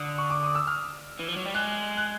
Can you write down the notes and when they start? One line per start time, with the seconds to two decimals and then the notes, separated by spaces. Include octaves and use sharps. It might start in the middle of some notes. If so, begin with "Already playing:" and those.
Already playing: D3 D#6
0.18 C#6
0.30 D6
0.43 D#6
0.55 E6
0.67 F6
1.20 E3
1.29 F3
1.37 F#3
1.46 G3
1.54 G#3 F#6
1.97 F#6